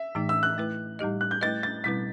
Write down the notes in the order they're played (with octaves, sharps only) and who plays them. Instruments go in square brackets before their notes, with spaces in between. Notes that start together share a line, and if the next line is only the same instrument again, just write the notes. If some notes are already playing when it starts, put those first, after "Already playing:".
Already playing: [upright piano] E5
[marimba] A2 E3 A3 D#4
[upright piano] E6
F#6
[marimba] A3 E4 B4
A2 G3 D#4 G4 D#5
[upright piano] F#6
G6
[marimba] A3 E4 B4 D#5 [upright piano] A6
[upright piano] A6
[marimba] B2 G3 C4 E4 B4 [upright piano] B6